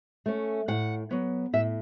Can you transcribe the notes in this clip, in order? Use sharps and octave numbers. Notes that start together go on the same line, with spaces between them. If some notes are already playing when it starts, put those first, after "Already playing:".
A3 C#4
A2 F#5
F#3 B3
A2 E5